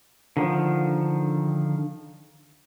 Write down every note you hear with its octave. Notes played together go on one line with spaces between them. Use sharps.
D3 D#3 F3